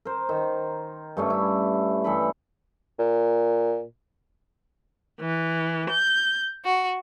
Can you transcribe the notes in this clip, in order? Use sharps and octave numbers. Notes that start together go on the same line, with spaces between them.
A#4 C5
D#3
G2 A3 C#4
E4
G2 E3 A4 B5
A#2
E3
G6
F#4